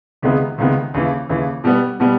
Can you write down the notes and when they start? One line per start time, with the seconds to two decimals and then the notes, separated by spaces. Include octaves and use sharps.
0.22 C#2 C3 D#3 G#3 B3
0.58 C#2 C3 D#3 G#3 B3
0.94 D#2 C#3 E3
1.29 D#2 C#3 E3
1.64 B2 G3 B3
2.00 B2 G3 B3